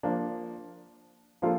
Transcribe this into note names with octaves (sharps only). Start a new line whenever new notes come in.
F3 A#3 D4
F3 A#3 D4 F4 A4